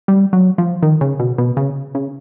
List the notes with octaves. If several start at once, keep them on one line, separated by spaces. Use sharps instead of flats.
G3
F#3
F3
D#3
C#3
B2
B2
C#3
C#3